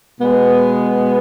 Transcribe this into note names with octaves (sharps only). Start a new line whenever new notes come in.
B2 G#3 B3